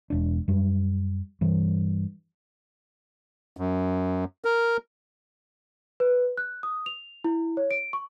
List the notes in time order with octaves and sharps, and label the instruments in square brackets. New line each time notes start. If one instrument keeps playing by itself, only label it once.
[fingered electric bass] E1 D4
F#2 G3
G2 E3
[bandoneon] F#2
A#4
[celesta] B4
F#6
D#6
F7
E4
C#5
D7
C#6